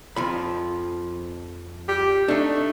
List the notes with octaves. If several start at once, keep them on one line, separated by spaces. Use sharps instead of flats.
F2 F3 B5
G4
A3 D4 D#4